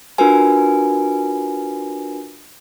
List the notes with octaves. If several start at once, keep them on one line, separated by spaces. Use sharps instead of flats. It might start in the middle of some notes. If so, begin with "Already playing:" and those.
D4 F4 F#4 A#4 B4 G#5